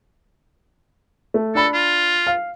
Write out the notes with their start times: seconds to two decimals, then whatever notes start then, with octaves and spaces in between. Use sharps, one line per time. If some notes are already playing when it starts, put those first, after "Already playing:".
1.34 A3
1.55 D4 A4 B5
1.74 F4
2.27 F5